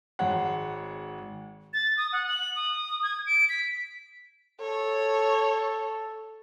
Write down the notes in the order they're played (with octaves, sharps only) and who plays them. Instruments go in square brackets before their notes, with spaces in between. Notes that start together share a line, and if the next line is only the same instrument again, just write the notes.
[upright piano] G#1 G#3 C#5 F#5
[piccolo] A6
D#6
F#5
F#7
D#6
G#6
D7
B6
[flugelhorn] A4 [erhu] C#5